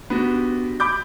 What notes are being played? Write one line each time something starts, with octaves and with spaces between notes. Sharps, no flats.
B3 D4 F#4 G4
B5 D6 G6